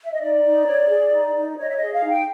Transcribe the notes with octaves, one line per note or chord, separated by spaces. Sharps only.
E5
D#5
D#4 D5
D#4
C#5
G#4
D#4
D#4
C#5 D#5
E5
D#5
G#4
F5
D#4
G5